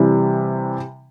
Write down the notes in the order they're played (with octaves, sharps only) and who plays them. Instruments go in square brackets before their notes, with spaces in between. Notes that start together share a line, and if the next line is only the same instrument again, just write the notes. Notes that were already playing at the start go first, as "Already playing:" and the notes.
Already playing: [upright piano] C3 E3 G3